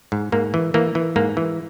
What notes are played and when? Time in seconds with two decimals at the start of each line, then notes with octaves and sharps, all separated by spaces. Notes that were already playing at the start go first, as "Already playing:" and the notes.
0.12 G#2
0.32 G#2 A#3
0.54 E3
0.74 E3 A#3
0.95 E3
1.16 G#2 A#3
1.37 E3